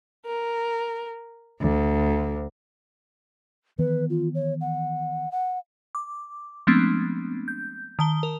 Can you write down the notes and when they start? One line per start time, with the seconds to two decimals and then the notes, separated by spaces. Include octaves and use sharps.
0.25 A#4
1.60 D2
3.79 D#3 E3 B3 B4
4.10 F4
4.35 C#5
4.61 F#5
5.32 F#5
5.95 D6
6.67 F3 G#3 A3 B3 C4 D4
7.48 G6
7.99 D#3 A5 G7
8.23 A#4